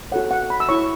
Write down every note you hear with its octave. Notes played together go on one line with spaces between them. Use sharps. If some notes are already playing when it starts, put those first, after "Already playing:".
F#4 A4 C#5 F#5
F#5
B5
E6
E4 C#5 C#6